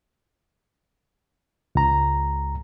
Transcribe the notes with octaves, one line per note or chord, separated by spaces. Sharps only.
C#2 A#5